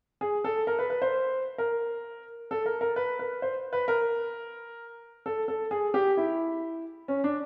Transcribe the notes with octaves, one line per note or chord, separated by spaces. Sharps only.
G#4
A4
A#4
B4
B4
C5
A#4
A4
A#4
A#4
B4
B4
C5
B4
A#4
A4
A4
G#4
G4
E4
C#4
D4